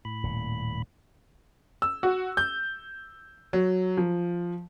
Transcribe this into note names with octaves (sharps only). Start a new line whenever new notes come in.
A2 B5
D#1 A#2
E6
F#4
G6
F#3
F3